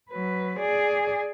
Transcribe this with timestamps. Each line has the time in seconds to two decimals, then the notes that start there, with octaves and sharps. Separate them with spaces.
0.11 F#3 B4
0.60 G#4 D5